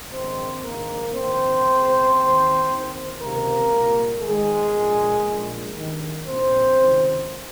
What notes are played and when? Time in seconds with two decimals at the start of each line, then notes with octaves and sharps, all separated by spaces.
0.11 A#1 G#2 D#3 C4 C5
0.63 A#1 G#2 D#3 A#3 A#4
1.14 A#1 G#2 D#3 C4 C5
1.65 C#2 C#3
2.17 D#2 D#3
2.67 D#2 D#3
3.19 C#2 C3 D#3 A#3 A#4
3.70 C2 A#2
4.22 G#1 G#2 D#3 G#3 G#4
4.73 A#1 A#2
5.23 A#1 A#2
5.74 G#1 G2 D#3
6.26 A#1 A#2 C4 C5
6.77 C#2 C3 D#3